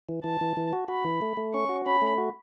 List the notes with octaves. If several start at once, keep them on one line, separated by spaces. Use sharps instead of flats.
E3
E3 A5
E3
E3
F#4
F#4 B5
E3
A3
A3
C#4 C#6
F#4
C#4 B5
A3
F#4